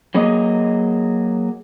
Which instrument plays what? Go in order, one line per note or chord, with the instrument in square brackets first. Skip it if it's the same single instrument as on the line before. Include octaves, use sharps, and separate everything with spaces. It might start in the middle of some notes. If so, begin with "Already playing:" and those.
[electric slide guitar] F#3 A#3 G#4 D#5